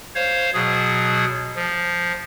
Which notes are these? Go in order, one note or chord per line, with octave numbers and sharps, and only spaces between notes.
C5 C#5 F5
B2 F#3 G#4
F3